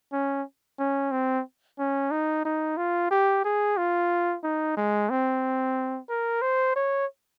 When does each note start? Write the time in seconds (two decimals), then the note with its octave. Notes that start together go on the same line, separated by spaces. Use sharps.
0.13 C#4
0.79 C#4
1.12 C4
1.79 C#4
2.11 D#4
2.45 D#4
2.78 F4
3.11 G4
3.45 G#4
3.77 F4
4.44 D#4
4.77 G#3
5.10 C4
6.09 A#4
6.42 C5
6.76 C#5